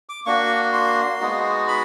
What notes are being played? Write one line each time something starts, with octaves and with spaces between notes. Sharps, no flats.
D6
A#3 D4 F#4 C#6
C6
G#3 B3 D#4 F#4
B5